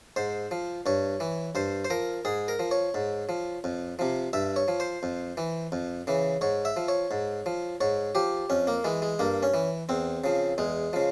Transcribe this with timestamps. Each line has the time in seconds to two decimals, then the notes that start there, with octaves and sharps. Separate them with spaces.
0.16 G#2 C5
0.51 F3
0.86 G2 C#5
1.20 E3
1.55 G2 C5
1.85 C5
1.90 F3 A#4
2.25 G#2 G#4
2.48 A#4
2.59 F3
2.71 C#5
2.94 G#2
3.29 F3
3.64 F2
3.99 C3 F3
4.33 G2 E5
4.56 C#5
4.68 F3
4.80 C5
5.03 F2
5.37 E3
5.72 F2
6.07 C#3 E3
6.41 G#2 C#5
6.65 E5
6.77 F3
6.88 C#5
7.11 G#2
7.46 F3
7.81 G#2 C#5
8.15 F3 G4
8.50 F2 C#4
8.67 A#3
8.84 E3 G#3
9.02 G#3
9.19 G2 A#3
9.43 C#4
9.54 E3
9.89 E2 C4
10.24 C#3 F3
10.58 E2 G#3
10.93 C#3 F3